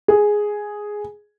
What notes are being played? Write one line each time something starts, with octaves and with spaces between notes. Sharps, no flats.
G#4